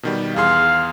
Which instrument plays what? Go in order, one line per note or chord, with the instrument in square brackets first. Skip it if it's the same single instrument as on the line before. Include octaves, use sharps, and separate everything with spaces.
[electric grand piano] B2 D#3 G3
[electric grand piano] E2 G#4 C6 [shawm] F5